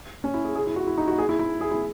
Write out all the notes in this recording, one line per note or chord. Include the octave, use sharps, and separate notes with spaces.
C#4
E4
G#4
G#4
E4
F#4
E4
D#4
F#4
G#4
E4
E4
G#4
E4